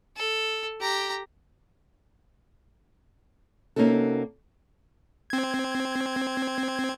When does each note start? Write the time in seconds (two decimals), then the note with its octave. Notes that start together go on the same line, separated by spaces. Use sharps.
0.17 A4
0.81 G4 A#5
3.76 C3 A#3 C#4 D#4 F#4 A4
5.30 C4 G#6